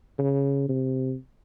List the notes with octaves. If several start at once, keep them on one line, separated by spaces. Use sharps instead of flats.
C#3
C3